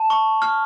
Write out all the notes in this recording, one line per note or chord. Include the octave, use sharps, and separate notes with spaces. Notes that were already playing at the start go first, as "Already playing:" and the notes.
Already playing: A5
C#6
F6